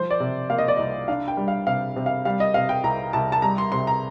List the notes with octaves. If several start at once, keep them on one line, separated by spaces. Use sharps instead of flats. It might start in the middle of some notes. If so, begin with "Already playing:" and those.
Already playing: F3 C5
D5
C3
A#3 F5
D#5
D5
C2 D#5
D4 F5
G5
G3
F5
C3 F5
C3
F5
G3 F5
D#5
C3 F5
G5
C2 A#5
C2 A5
A5
G3 A#5
C6
C3 C6
A#5